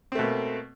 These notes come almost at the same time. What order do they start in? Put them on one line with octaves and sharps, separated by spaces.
C4 A3 B2 A#3